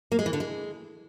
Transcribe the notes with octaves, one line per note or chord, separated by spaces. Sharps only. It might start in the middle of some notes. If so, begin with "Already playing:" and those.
A#3
G#3
E3
D3
G#3